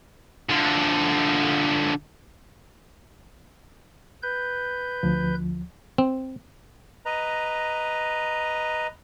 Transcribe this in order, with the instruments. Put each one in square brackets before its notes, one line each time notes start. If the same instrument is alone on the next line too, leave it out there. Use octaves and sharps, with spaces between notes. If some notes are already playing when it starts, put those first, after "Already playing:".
[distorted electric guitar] D3 F3
[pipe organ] B4 G6
[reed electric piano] D2 F3
[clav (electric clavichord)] C4
[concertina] B4 D#5 A#5